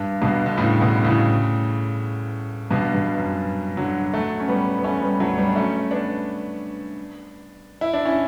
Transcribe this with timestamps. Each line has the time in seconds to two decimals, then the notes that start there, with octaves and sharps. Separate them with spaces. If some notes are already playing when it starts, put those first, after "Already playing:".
Already playing: G2
0.22 G2 B2
0.46 D3
0.58 A2 C#3
0.81 B2 D3
1.04 A2 C#3
2.71 G2 B2
2.94 G2
3.18 F#2
3.77 D3 F#3
4.14 F#3 A3
4.40 C#4
4.48 G3 B3
4.78 B3
4.84 A3 C#4
5.02 G3 B3
5.20 F#3 A3
5.38 G3 B3
5.49 D4
5.56 A3 C#4
5.91 B3 D4
7.81 E4
7.93 D4
8.05 C#4 E4